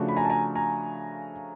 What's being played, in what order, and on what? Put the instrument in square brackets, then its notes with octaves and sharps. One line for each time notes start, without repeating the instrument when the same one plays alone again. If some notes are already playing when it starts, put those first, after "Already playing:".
Already playing: [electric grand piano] C#3 F3 A3 D4 F#4
[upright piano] B5
G#5 A#5
A5
G#5 A#5
G#5 A#5